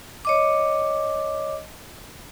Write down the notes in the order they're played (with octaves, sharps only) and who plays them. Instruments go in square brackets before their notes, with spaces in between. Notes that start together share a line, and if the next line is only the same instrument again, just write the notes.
[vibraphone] C#5 D#5 D6